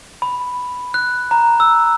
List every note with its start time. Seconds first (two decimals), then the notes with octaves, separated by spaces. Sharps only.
0.22 B5
0.94 F#6
1.31 A#5
1.60 E6